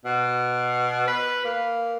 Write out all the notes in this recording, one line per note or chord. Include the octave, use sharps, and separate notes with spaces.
B2
B4
A#3